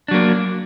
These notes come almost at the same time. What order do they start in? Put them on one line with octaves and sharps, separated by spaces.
D4 F#3 A#3